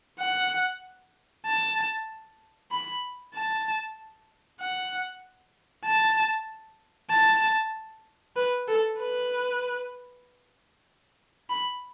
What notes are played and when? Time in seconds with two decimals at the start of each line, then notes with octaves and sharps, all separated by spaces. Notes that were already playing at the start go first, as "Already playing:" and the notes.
0.20 F#5
1.46 A5
2.71 B5
3.34 A5
4.60 F#5
5.85 A5
7.10 A5
8.36 B4
8.68 A4
9.00 B4
11.49 B5